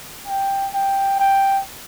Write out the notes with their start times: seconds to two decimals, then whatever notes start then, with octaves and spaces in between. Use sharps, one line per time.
0.28 G5
0.74 G5
1.20 G5